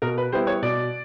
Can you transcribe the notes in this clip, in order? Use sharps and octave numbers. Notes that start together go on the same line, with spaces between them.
B2 A#4
B4
G3 B3 E4 C5
C#5
B2 D5